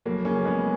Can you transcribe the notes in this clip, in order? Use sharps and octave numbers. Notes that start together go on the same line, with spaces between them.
F1 F#3 A#3
C#3 A#3 C#4
C#3 G#3 B3